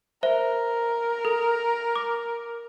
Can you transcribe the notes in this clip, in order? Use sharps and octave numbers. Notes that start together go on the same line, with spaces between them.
A#4 C5 E5
A4
D6